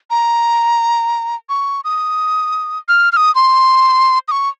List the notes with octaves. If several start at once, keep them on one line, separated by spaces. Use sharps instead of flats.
A#5
C#6
D#6
F6
F6
D#6
C6
D#6
C#6